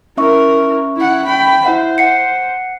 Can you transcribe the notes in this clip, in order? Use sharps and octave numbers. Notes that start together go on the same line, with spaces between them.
C#4 E4 A#4 E5 C#6
E4 F#5
G5 B5
E4 C5 E5 F#5
F#5 C7 C#7